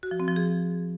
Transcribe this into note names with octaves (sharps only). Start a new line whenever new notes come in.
F#4
F3
C4
F3
G#4